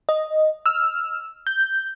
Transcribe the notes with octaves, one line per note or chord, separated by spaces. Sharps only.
D#5
E6 F6
G6